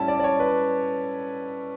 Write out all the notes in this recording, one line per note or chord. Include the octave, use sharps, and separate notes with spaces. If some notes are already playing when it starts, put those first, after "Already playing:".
Already playing: A2 G3 C#4 E4 A5
D5
D5
C#5
B4